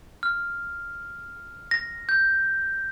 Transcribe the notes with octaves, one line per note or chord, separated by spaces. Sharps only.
F6
A#6
G6